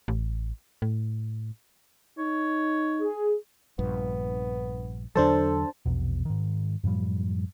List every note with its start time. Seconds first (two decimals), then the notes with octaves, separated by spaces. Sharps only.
0.08 A1
0.82 A2
2.18 D#4 C#5
3.00 G#4
3.79 A#1 G2 B3
5.16 E2 D3 F#3 D4 A4 C5 A5
5.86 A#1 E2 B2
6.25 G#2 D#3
6.84 F#2 A2 F3 G3